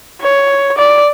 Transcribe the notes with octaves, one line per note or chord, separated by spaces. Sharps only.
C#5
D5